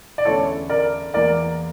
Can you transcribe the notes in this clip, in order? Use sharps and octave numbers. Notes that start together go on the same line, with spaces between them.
D5
E2 D3 A3 C#4 E4 A4 C#5
A#4 D5
E2 E3 A#3 A#4 D5